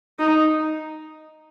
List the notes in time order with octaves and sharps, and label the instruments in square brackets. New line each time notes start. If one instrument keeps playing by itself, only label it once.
[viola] D#4